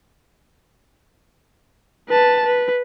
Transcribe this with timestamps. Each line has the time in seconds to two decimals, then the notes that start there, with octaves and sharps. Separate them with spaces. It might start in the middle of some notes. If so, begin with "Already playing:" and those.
2.09 B4 A5
2.46 B4